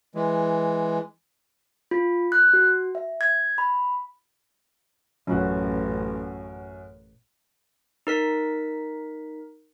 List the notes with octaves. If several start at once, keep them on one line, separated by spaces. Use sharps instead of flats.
E3 G#3
F4
F#6
F#4
E5
G#6
B5
A1 F#2 F#4
D#4 A#4 B6